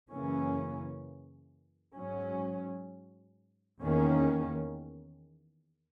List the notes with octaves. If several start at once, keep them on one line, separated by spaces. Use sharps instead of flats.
F#2 C#3 E3 A#3 C#4
G#2 F#3 C#4
E2 D#3 A#3 C#4